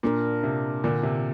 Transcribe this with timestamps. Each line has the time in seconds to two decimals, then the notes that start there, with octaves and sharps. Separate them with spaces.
0.03 A#2 A#3 D4 A#4
0.43 C3
0.84 A#2 D3
1.03 C3